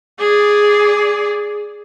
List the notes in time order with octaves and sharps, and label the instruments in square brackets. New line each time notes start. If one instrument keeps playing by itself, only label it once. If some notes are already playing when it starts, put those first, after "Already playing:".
[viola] G#4 D5